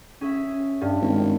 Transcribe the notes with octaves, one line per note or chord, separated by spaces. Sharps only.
C#4 G#4 E5
G2
G#1